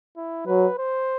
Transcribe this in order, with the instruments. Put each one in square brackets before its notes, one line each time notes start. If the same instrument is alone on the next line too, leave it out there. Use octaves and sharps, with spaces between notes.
[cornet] E4
[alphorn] F#3 [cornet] B4
[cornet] C5